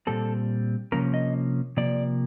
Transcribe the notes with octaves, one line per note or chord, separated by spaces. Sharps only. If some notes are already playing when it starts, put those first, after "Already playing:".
A#2 G3 C4 A4
C3 F3 A#3 C#4 A#4
D#5
C3 F3 A#3 D5